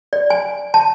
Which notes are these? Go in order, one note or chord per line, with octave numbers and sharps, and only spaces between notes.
D5
G#5
A5